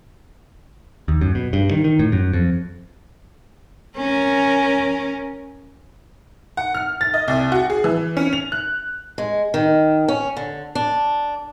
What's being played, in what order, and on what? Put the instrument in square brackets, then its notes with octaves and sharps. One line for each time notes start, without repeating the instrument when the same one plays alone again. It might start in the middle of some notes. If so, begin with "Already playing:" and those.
[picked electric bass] D#2
F#2
B2
G2
D#3
D#3
A2
F#2
F2
[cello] C#4 A#4
[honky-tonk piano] F#5
F6
A6
D#5
C2
F#4
G#4
E3
C#4
F7
F#6
[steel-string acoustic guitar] G#3
D#3
C#4
D3
D4